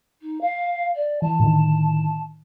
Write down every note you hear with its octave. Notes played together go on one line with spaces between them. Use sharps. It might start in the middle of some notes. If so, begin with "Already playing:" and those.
D#4
F5
D5
E3 A5
A2 D3 D#3